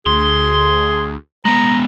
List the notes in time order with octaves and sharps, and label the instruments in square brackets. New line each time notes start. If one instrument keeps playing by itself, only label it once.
[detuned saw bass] D2 [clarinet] G#4 [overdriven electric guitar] C6
[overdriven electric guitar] G#3 B3 [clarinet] A#5